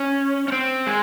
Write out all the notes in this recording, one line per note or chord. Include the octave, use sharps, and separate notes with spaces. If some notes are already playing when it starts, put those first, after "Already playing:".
Already playing: C#4
C#4
C4
G#3